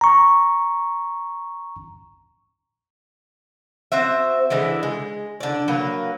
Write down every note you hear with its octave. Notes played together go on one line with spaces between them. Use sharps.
A#5 C#6
C4 F#4 C5 E5
D3 E3 G#3 E4
G#3
D3 D5
F#3 A#3 B4